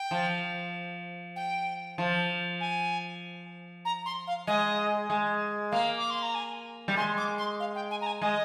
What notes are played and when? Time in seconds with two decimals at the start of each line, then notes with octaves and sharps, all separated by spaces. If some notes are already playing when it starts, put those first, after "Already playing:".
Already playing: G5
0.11 F3
1.36 G5
1.98 F3
2.60 G#5
3.85 A#5
4.06 C6
4.27 F5
4.47 G#3 D#5
5.10 G#3
5.72 A#3 F5
5.97 D6
6.10 C6
6.23 A#5
6.35 G#5
6.88 G3
6.97 G#3 C6
7.17 D6
7.38 C6
7.60 F5
7.75 G5
7.91 G#5
8.01 A#5
8.06 G#5
8.22 G#3 D#5